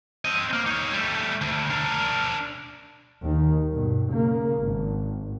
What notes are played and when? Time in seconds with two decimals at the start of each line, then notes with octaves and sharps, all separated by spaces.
0.25 C4 D#5
0.53 A#3
0.66 D#4 C#5
0.93 G3 A3
1.41 D2
1.70 D4 A#4
3.22 D#2 D#3
3.71 G2 B2
4.09 C#3 A#3
4.59 G#1